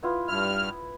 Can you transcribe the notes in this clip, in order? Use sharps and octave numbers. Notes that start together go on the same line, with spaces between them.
B3 E4 F4
G2 E4 F6